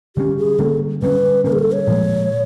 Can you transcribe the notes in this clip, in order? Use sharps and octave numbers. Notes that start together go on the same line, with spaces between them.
D3 G3 A#3 C#4 G4
G#4
D3 G3 A#3 C#4 A4
D3 G3 A#3 C#4 B4
D3 G3 A#3 C#4 A#4
G#4
A4
C#5
A#2 F3 G#3